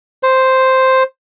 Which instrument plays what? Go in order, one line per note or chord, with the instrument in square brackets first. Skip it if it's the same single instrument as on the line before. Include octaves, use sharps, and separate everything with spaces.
[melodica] C5